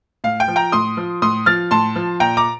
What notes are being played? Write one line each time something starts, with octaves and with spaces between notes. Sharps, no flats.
A2 F5
G5
F3
G5 A#5
A2 C6 D#6
F3
A2 C6 D#6
F3 F6 A6
A2 A5 C6
F3
A#2 G5 A#5
A#5 D6